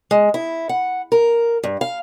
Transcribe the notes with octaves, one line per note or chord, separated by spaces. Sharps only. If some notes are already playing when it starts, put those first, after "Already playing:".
G#3
E4
F#5
A#4
G2
F5